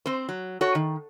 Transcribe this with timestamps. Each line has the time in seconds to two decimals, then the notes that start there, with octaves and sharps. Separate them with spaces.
0.06 C4 C5
0.29 F#3
0.61 F#4 A4 C#5
0.75 D#3